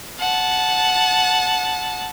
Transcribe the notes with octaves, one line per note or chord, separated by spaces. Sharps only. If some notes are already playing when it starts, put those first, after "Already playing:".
F#5 A5